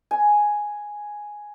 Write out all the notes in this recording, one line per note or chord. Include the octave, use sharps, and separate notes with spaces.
G#5